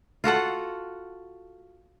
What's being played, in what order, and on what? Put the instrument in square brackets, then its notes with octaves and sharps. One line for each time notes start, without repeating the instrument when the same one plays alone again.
[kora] F4 F#4 A4 F#5